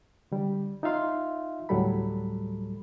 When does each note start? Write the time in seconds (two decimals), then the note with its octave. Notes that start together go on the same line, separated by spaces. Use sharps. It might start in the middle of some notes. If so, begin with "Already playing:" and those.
0.32 D3 G3
0.83 D#4 F4 E5 F5 C6
1.69 D2 A2 F#3 G3 A4 B5